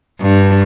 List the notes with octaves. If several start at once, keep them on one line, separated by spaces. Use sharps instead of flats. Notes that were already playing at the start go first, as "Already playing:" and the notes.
G2